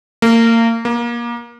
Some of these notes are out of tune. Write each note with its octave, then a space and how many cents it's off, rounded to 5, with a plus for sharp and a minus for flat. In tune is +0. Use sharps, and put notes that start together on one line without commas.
A#3 -30
A#3 +25